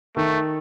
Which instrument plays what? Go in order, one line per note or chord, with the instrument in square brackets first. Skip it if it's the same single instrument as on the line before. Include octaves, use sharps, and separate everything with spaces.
[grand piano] D#3 [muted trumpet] A3